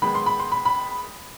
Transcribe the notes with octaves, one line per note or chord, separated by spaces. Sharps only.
D#3 G#3 B3 B5
C6
B5
C6
B5
B5